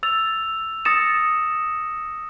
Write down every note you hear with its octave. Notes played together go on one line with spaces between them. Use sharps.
E6 A6 F7
D#6 A6 A#6 C#7 E7